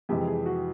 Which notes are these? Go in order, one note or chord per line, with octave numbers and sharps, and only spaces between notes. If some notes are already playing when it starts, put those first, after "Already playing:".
F2 C3 E3 G#3 G4
G#4
F#4